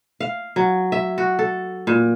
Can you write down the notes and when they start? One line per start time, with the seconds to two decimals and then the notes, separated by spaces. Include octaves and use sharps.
0.20 F5
0.56 F#3
0.92 E5
1.18 F#4
1.39 A4
1.87 A#2